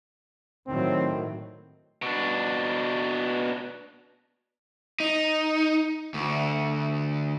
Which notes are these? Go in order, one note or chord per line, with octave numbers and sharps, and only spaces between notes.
A2 D#3 F#3 C4
B2 D4
D#4
D2